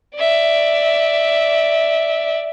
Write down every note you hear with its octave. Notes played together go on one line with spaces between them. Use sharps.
D5 E5